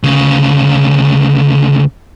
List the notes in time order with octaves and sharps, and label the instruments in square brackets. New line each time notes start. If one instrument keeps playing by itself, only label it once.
[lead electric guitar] D2 C#3